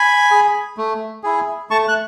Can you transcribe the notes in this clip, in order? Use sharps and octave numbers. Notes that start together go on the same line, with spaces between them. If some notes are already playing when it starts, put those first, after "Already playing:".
Already playing: G#5 B5
G#4
A3
E4 G#4
A3 A5 C#6
F#6